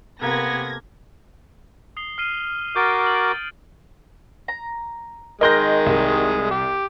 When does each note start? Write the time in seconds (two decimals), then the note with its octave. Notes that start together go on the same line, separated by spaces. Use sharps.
0.21 C3 A#3 B3 A4 G#6 A#6
1.97 D#6 C7 G7
2.18 F6 C7 D#7
2.76 F#4 A#4 D6 G6 A6 D7
3.06 D7 F#7
4.48 A#5
5.41 D#3 G#3 A#4 D#5 C6 F#6 G6 A#6
5.86 C2
6.51 G4